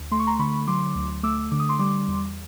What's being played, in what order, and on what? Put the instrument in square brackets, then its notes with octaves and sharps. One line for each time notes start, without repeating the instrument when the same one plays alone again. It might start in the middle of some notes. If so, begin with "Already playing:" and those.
Already playing: [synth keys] D2
A3 C6
C#6
A#5 C6
D3 B5 C#6
F#3 C6 D6
D2
A3 D6 E6
D3 D6
D#6
C6 D6
G3 C6 D6
E2